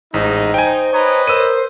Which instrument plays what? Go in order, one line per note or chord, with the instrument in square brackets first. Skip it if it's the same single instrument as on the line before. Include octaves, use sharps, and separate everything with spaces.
[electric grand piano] A1 [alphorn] G#2 [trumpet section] D#4
[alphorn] C5 [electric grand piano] G5 G#5
[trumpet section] B4 C#5 D#5 [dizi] A#5
[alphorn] A#4 [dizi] C5 [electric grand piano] E6 D#7